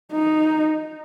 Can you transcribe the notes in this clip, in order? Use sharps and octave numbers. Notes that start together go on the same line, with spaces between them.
D#4